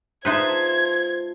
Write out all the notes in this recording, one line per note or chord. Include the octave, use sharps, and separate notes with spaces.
G#3 D#4 F4 B4 C5 E5 A5 G#6